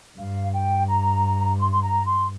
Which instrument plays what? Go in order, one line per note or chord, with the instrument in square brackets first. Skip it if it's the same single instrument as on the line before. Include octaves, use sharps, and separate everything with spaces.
[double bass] G2 [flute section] F5
[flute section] G5
A#5
C6
C6
A#5
C6